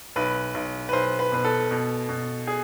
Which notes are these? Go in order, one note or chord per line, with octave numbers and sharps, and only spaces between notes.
B1 B4
B1
B4
B1 C5
B4
B2 B4
A4
B2
B2
G#4